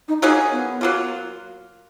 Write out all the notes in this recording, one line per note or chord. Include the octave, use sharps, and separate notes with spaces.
D#4
F#3 A#3 C#4 D#4 G#4
B3
F#3 A#3 F4